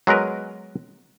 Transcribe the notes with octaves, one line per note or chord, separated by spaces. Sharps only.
F#3 G#3 B3 A#4 B4